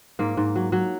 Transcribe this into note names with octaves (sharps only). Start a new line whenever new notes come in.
G#2 A#3
G#2
F#3
F#3